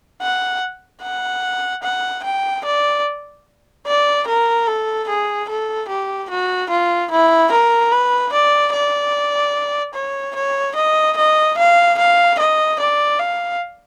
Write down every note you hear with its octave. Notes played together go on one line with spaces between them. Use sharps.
F#5
F#5
F#5
G5
D5
D5
A#4
A4
G#4
A4
G4
F#4
F4
E4
A#4
B4
D5
D5
C#5
C#5
D#5
D#5
F5
F5
D#5
D5
F5